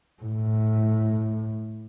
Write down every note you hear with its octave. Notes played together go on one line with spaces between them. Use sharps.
A2